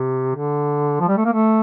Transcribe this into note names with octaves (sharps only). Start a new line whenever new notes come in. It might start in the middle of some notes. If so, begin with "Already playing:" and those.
Already playing: C3
D3
F3
G3
A3
A#3
A3